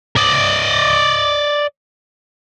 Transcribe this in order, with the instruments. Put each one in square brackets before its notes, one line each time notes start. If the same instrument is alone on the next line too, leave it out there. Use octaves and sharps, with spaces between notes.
[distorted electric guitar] D5 D#5